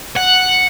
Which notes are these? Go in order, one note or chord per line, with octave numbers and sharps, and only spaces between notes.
F#5